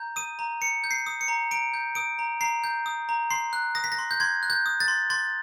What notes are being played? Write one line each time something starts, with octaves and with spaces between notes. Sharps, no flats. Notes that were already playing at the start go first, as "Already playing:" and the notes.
Already playing: A#5 G6
D#6 D#7
A#5
A#5 C#7
G6
C7
D#6
C#7
A#5
A#5 D7
G6
D#6 D7
A#5
A#5 C7
G6
D#6
A#5
C6 C7
F#6
D#6 A#6
B6
A#6
C6
G6
C6 G#6
F#6
G6
D#6
A6
C6
C6 A6